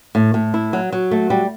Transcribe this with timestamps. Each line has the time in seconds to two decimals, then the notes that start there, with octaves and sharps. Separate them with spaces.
0.15 A2
0.34 A2
0.54 E4
0.73 F#3
0.92 F#3
1.11 A3
1.30 G3